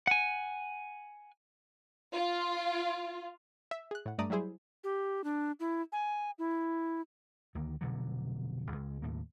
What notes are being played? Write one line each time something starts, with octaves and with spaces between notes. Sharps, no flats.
F#5 G#5
F4
E5
G#4 F#6
A2 F#5
G2 A3 D5 A#5 D#6
F#3 G3 E4 G#4 C5
G4
D4
E4
G#5
E4
D2 D#3 A#3
F1 B2 D3 F#3
C#2 G#3
D#2 A2 A#3